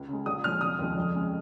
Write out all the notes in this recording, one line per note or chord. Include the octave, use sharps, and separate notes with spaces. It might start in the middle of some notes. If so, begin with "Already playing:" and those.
Already playing: C#2
C#3 G#3
A#1 D#6
A#2 F3 G#3 F6
F1 D#6
D#2 C#3 F3 G#3
F2
C#3 G#3